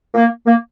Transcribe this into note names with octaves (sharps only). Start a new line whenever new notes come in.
A#3
A#3